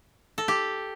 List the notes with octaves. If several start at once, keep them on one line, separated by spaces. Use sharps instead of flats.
A4
G4